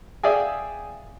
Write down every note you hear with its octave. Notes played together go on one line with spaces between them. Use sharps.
G#4 D5 E5 F5 G5 G#5